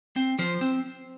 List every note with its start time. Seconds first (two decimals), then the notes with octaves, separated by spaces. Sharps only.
0.16 C4
0.39 F3 C5
0.61 C4